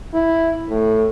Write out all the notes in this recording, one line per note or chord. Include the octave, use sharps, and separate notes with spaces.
E4
A2